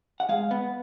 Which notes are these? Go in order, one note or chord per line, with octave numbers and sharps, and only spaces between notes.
F#5
G#3 F5
B3